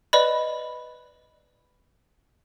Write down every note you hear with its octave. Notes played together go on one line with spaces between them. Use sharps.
B4 D5 D#5 B5